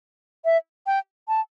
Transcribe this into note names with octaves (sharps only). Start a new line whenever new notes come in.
E5
G5
A5